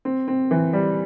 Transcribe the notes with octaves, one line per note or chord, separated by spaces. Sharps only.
C4
C4
E3
G3